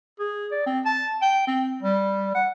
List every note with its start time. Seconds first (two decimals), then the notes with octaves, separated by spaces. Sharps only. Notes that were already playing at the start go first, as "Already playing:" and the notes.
0.19 G#4
0.51 D5
0.66 C4
0.85 A5
1.22 G5
1.47 C4
1.82 G3
2.35 F#5